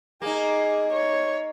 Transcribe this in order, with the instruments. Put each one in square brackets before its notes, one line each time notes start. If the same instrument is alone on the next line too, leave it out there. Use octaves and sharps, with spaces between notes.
[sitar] A#3 D#4 [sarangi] G#4
[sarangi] C#5